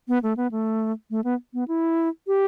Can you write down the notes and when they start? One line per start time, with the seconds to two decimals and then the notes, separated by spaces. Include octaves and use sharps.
0.08 B3
0.23 A3
0.37 B3
0.51 A3
1.10 A3
1.24 B3
1.54 B3
1.68 E4
2.27 G4